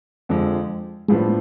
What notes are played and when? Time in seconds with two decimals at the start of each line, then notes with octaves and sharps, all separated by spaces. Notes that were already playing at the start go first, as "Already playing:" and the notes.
0.29 F2 D3 F3 G#3
1.09 A2 F3 G#3 B3 D4